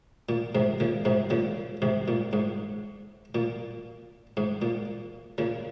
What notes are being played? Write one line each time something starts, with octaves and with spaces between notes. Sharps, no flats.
A#2
G#2 C3
A#2 C#3
G#2 C3
A#2 C#3
G#2 C3
A#2
G#2
A#2
G#2
A#2
A#2 C#3